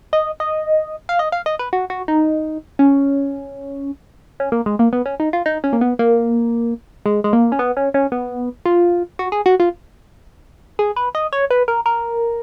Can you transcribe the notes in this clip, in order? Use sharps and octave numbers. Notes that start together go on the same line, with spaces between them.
D#5
D#5
F5
D#5
F5
D#5
B4
F#4
F#4
D#4
C#4
C#4
A#3
G#3
A#3
B3
C#4
D#4
F4
D#4
C#4
A#3
B3
A#3
G#3
G#3
A#3
C#4
B3
C#4
C#4
B3
F4
F#4
G#4
F#4
F4
G#4
B4
D#5
C#5
B4
A#4
A#4